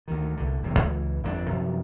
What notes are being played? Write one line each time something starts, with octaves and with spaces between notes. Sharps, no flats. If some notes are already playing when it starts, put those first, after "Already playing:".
D2 D#3
C2 D3
D#1 E2 C3 F#3
C#2 E3
G1 F2 D#3 D4
F#2 C3 F3